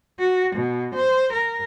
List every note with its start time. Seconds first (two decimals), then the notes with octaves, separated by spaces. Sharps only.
0.19 F#4
0.56 B2
0.95 C5
1.33 A#4